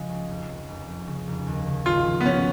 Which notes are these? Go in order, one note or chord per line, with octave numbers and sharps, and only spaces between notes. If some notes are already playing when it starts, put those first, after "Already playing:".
Already playing: C#3 F3 G#3
C#2
F1
F1
F1
F1
C#3
F1
D#2
C#3
G#1 F4
F3
B3
F3 C#4